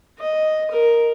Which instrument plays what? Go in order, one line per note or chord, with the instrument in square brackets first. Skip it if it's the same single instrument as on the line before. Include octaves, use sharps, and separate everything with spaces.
[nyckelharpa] D#5
A#4